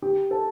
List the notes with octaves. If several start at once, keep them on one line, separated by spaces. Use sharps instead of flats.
G4
A4